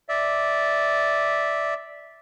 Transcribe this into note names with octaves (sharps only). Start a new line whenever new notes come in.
D5 E5